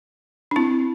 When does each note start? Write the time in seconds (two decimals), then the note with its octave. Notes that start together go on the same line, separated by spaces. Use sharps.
0.51 D4
0.56 C4 E4